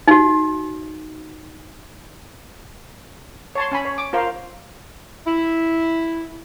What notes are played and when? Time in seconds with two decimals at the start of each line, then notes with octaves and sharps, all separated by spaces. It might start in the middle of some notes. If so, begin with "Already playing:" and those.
0.08 D#4 F#4
3.55 C#5 A5 C6
3.72 C#4 G#5 B5
3.85 C#5
3.98 D6
4.13 F4 A#4 C5 F5
5.26 E4